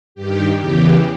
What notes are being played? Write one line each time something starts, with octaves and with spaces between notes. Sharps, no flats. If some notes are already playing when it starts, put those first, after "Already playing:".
G2 D#3 G4
E2 C#3 E3 G4